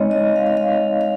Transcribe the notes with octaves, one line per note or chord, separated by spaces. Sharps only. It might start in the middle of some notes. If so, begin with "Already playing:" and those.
Already playing: G#3 C4 D#4 C#5 D#5
D#5
F5
D#5
F5
F5